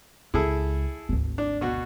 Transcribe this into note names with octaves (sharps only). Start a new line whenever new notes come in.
C#2 E4 G#4 A4
G#1 D2
D4
B2 F#4